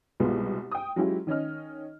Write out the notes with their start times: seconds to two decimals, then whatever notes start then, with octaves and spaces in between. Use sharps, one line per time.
0.20 C2 B2 G#3 B3 F4
0.71 G5 D#6
0.96 F#3 G#3 C#4 E4 F4 G4
1.27 D#3 C#4 D#5 F6